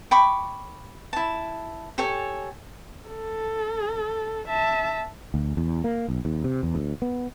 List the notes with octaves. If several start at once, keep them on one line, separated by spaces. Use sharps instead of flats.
G5 B5 C#6 D6
E4 A5
G4 A4 C#5 G#5
A4
E5 A5
D2
E2
A#3
B1
D#2
C3
E2
D2
B3